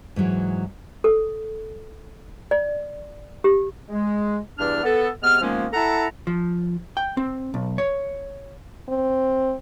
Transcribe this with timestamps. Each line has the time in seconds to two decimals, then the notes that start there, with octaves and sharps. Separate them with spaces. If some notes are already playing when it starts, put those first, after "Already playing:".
0.16 G#2 E3 F#3 G#3
1.04 A4
2.51 D5
3.44 G4
3.89 G#3
4.58 E2 G2 D4 D5 F6
4.83 B3 A4
5.23 C3 G#3 B3 F6
5.41 D#3 F3 G#3 A#3 B3 C#4
5.73 E4 A4 F#5 A5 A#5
6.27 F3
6.97 G5
7.17 C4
7.54 B1
7.78 C#5
8.88 C4